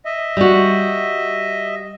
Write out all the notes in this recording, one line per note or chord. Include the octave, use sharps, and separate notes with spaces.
D#5 E5
G3 F#4